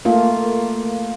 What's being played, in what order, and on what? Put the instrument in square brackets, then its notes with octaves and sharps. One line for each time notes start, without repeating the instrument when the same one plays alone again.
[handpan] A3 A#3 F4